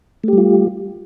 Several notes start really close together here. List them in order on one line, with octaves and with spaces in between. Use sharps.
A3 G4 G3 F4